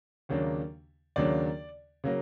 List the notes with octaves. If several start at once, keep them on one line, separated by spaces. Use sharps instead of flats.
D#2 C#3 F#3 A#3 D4
D#2 C#3 F#3 A#3 D4 D5
C#3 F#3 A#3